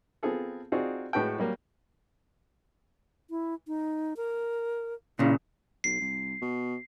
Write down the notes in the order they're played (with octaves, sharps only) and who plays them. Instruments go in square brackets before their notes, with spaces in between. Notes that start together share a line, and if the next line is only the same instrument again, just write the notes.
[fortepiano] B3 C4 F4 G#4 A4
C4 D#4 F4 F#4 G#4 D5
A2 G#3 F#4 B4 F#5 G5
F#3 G3 A#3
[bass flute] E4
D#4
A#4
[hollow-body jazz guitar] A#2 C#3 [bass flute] E4
[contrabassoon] B1 [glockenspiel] C7
[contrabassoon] C2
B2